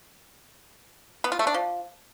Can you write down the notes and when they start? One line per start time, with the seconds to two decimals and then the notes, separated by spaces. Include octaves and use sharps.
1.24 B3
1.32 F4
1.39 A3
1.47 D4
1.54 F3